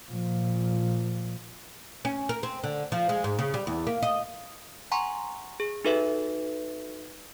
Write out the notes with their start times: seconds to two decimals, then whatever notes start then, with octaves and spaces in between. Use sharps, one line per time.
0.11 A#2 F3
2.05 C#4
2.29 A#4
2.43 C4
2.64 D3
2.92 F3
3.09 G#3
3.24 G#2
3.39 C#3
3.54 G3
3.67 E2
3.87 A#3
4.03 D#5
4.92 F#5 G#5 A#5 C6 C#6
5.60 G#4
5.85 D#4 F#4 A4 B4 E5